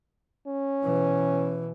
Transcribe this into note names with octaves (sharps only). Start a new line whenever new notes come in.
C#4
B2 E3